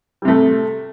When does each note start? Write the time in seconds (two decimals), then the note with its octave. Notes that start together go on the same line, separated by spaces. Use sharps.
0.22 G3
0.25 C3
0.28 A3